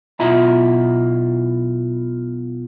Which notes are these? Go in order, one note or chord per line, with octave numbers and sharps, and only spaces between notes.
B1 B2 E4 F4 E5 A#5